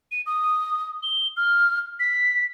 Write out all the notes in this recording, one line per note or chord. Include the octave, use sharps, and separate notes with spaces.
D#7
D#6
G7
F6
B6